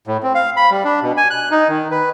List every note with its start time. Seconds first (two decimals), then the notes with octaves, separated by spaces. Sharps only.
0.07 A2
0.23 C4
0.35 F5
0.57 B5
0.70 G3
0.85 D4
1.02 B2
1.17 G#5
1.30 F#6
1.51 D#4
1.68 D#3
1.91 B4